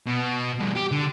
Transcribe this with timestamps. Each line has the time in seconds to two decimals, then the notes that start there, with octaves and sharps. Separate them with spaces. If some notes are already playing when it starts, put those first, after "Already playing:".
0.06 B2
0.59 G2 B2
0.75 G4
0.91 D3